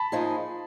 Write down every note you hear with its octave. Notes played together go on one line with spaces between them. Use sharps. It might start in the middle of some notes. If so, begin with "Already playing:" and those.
Already playing: A5 B5
F3 A#3 D#4 G#4